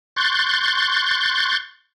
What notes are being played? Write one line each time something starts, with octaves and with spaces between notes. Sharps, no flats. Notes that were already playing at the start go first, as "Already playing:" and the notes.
C6 C#6 F#6 G6 A6